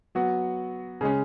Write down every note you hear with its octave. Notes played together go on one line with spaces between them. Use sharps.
F#3 B3 F#4
C#3 G#3 C#4